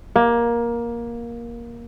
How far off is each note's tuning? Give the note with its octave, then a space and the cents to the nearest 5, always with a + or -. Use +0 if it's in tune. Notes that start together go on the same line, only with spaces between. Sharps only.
A#3 +15